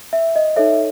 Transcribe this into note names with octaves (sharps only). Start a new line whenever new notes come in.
E5
D#5
D#4 A4 C#5 E5